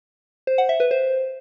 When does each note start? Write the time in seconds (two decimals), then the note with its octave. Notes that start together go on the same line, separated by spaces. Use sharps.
0.47 C5
0.58 F#5
0.69 E5
0.80 B4
0.91 C5